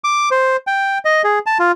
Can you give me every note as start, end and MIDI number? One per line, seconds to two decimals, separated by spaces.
0.04 0.29 86
0.31 0.57 72
0.67 0.98 79
1.05 1.22 75
1.24 1.39 68
1.46 1.58 81
1.59 1.72 65